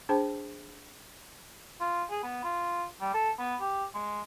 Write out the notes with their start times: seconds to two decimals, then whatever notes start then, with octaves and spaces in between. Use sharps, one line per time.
0.09 D4 G#4 C5 G5 A5 B5
1.81 F4
2.11 G#4
2.24 B3
2.44 F4
3.01 G3
3.14 A4
3.39 B3
3.61 G4
3.94 G#3